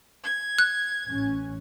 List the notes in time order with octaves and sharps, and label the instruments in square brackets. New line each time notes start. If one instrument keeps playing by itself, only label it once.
[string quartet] G#6
[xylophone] F#6
[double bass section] A1 A2 C#4